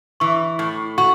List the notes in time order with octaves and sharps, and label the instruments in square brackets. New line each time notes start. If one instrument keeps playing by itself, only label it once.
[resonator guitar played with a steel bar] E3 [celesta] C#6
[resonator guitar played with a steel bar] A2
[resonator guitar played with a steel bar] F#4 [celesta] C#6